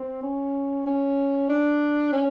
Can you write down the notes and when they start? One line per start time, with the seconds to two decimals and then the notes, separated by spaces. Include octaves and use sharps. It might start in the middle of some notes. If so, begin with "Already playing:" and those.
Already playing: C4
0.23 C#4
0.86 C#4
1.49 D4
2.13 C#4